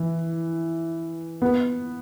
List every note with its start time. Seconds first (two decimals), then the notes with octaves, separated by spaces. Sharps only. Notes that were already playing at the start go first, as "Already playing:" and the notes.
Already playing: E3
1.42 B3